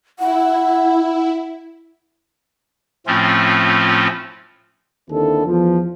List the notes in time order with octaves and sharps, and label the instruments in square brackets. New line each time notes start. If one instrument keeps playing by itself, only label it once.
[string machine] E4 [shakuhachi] F#5
[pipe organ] A2 F3 A3 C4 C#4 F4
[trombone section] D#2 D3 C4 E4 A4
E2 F3